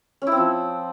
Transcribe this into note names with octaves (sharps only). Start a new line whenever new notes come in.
C#4
E4
C4
F3